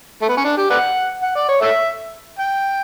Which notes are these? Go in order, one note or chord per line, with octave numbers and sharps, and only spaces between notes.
A3
B3
C#4
D4
G4
B4 D5 F#5
F#5
D5
C#5
A4 C#5 E5
G5